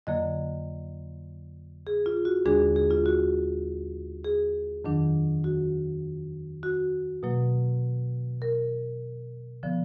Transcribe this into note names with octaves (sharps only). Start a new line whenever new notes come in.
F2 D3 F#3 A#3 D#5
G#4
F4
F#4
D#2 D3 G#3 D4 G#4
G#4
F4
F#4
G#4
F2 D#3 F#3 D4
F#4
F#4
B2 F#3 A#3
A#4
D3 F3 B3